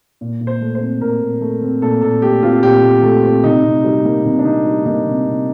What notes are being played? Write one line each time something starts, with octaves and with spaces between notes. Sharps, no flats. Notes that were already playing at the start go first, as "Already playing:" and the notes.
A#2
A#2
C5
A3
C5
C4
A#2 A#4
A#2
A3
C4
A#2 A4
A#2 A4
A3 G4
C4 F4
A#2 G4
A#2
A3
C4
C3 D#4
C3
G3
A#3
C3
D4
C3 D#4
G3
A#3 D#4
C3
C3